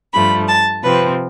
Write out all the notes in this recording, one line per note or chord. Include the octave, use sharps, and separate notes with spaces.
G2 F3 A3 B5
A5
C3 F3 C4 B4